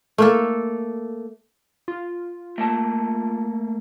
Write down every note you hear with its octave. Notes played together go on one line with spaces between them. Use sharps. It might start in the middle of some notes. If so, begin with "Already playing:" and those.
A3 A#3 A4
F4
A3 A#3 A5